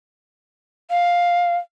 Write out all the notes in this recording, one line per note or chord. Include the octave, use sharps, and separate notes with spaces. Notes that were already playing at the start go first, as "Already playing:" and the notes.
F5